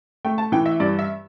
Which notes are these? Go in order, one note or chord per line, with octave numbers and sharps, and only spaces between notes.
A3 G5
A5
E3 G5
E5
G2 D5
E5